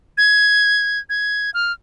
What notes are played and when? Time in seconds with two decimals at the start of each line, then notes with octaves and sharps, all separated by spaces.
0.17 G#6
1.09 G#6
1.54 F6